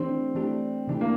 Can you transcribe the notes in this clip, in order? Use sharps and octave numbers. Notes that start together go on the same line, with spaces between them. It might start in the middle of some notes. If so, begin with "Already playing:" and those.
Already playing: E3 A3 C4 D4 G4
E3 A3 D4 G4
C3 E3 A3 D4 G4
A#3